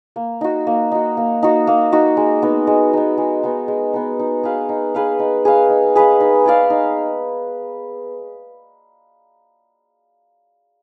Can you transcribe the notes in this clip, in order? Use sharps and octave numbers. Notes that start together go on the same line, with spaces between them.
A#3
D#4 F#4
A#3
D#4 F#4
A#3
D#4 F#4
A#3
D#4 F#4
G#3
B3 D#4
G#3
B3 D#4
G#3
B3 D#4
G#3
B3 D#4
D#4
G#4 B4 F5
D#4
G#4 B4 F5
D#4
G#4 B4 F5
D#4
G#4 B4 F5
D#4
G#4 D5 F5
D#4